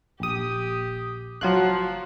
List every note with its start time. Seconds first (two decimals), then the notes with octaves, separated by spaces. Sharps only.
0.20 D#1 A#1 G4 D#6
1.41 F#1 F3 F#3 F4 F#6